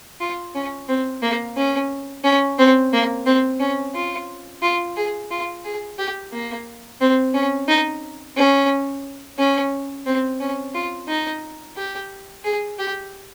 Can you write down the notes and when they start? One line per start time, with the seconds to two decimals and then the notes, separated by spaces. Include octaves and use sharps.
0.21 F4
0.55 C#4
0.89 C4
1.22 A#3
1.57 C#4
2.24 C#4
2.58 C4
2.93 A#3
3.26 C4
3.60 C#4
3.95 F4
4.62 F4
4.96 G#4
5.31 F4
5.65 G#4
5.98 G4
6.33 A#3
7.01 C4
7.34 C#4
7.68 D#4
8.37 C#4
9.38 C#4
10.06 C4
10.40 C#4
10.74 F4
11.08 D#4
11.77 G4
12.44 G#4
12.79 G4